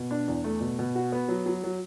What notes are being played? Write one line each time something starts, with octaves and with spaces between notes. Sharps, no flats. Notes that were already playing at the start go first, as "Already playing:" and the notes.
Already playing: B2
D4
E2
A3
B2
B2
F#4
B3
F#3
F#3
F#3